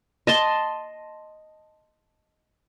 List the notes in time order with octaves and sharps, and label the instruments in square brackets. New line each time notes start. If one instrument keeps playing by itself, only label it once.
[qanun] D#5 A5 C6